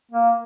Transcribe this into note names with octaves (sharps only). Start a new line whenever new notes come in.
A#3